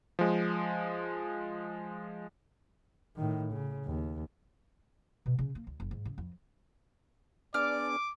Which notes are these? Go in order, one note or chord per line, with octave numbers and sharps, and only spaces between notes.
F3 G#3
A2 D#3
C#3
D#2
B2
C#3
A#3
D2
F#1
G#2
C#3
F2
B3 D4 G#4 D5 D6 F6